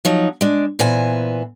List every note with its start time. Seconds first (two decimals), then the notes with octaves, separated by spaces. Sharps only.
0.05 F3 F#3 D#4
0.41 G#3 D4
0.79 A#2 E3 B3 C5 G#5